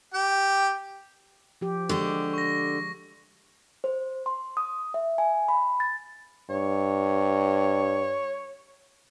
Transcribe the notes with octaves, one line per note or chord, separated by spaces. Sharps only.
G4 G5
F3 G4
D3 G#3 G4 C#6
C#6 A#6
C5
C6
D#6
E5
G#5
B5
A6
G2 C#5